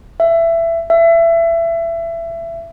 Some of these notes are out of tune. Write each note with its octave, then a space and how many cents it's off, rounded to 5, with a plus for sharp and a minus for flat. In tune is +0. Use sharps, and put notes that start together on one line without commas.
E5 +20
E5 +25